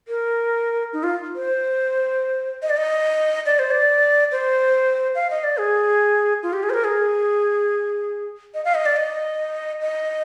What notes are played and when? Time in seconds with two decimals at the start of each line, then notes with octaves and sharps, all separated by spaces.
0.08 A#4
0.93 D#4
1.03 F4
1.35 C5
2.62 D#5
2.70 D5
2.77 D#5
3.46 D5
3.59 C5
3.71 D5
4.32 C5
5.15 F5
5.30 D#5
5.44 D5
5.58 G#4
6.43 F4
6.53 G4
6.63 G#4
6.70 C5
6.74 A#4
6.84 G#4
8.54 D#5
8.65 F5
8.75 D#5
8.86 D5
8.97 D#5
9.81 D#5